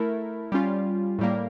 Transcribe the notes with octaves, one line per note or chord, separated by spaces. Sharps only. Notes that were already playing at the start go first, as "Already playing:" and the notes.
Already playing: A3 E4 A#4
G3 C#4 F4
A2 G3 A#3